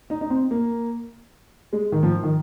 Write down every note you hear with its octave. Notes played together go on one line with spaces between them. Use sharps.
D#4
D#4
C4
A#3
G#3
D#3
F3
D#3